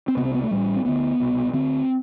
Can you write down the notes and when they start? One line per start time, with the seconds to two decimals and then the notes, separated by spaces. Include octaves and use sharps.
0.08 C4
0.17 C3 B3
0.21 C2 C4
0.34 B3
0.43 A3
0.51 A1 A2 G3
0.76 C4
0.85 D2 D3 B3
1.20 C2 B2
1.53 D2 D3 C4